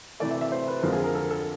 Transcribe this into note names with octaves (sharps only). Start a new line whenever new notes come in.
C3 E3 A3 D5
E5
E5
C5
B4
F2 D3 F3 G#3 A#4
G#4
A#4
A4
A4